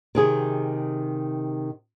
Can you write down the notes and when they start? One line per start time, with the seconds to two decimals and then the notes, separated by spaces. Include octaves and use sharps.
0.15 C3 D#3 G#4